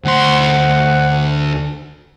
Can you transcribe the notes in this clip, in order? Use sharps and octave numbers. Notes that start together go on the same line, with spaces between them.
D2 C5 F#5 C6